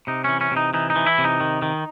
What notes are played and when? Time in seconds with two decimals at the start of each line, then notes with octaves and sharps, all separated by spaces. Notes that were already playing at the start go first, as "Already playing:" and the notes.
0.07 C3 D#4
0.24 E3 C#4
0.41 C#4
0.51 C3
0.56 D#4
0.74 E3 D#4
0.90 D#4
0.96 E3
1.06 E4
1.18 C3
1.24 D#4
1.40 D#3
1.62 D#3